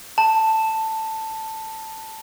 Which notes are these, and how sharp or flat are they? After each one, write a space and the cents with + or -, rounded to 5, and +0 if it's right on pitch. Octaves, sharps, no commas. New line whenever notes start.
A5 +10